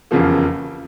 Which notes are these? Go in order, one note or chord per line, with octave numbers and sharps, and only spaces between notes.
F1 E2 C#3 F3 A#3